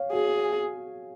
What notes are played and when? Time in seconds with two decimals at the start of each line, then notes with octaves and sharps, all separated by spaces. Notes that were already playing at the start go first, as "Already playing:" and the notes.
Already playing: C#5 F5
0.13 F#4 G#4